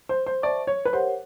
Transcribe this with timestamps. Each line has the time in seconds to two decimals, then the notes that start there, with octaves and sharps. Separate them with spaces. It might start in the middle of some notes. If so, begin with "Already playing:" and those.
0.09 C5
0.26 C5
0.42 C5 D5 E5 A5 C#6
0.67 C#5
0.85 B4
0.93 G4 A#4 C5 C#5 F#5